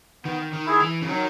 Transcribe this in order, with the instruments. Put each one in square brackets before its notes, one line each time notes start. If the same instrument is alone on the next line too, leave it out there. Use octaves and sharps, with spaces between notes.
[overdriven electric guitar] D#3 [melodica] B3
[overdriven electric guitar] D#3
[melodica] E4 G#4
[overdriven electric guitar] E3
C#3
[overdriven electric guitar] D#3 [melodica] F#3